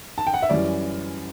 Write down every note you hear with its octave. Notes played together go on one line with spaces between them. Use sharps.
A5
G5
F#5
E5
F#2 E3 G3 C#4 D5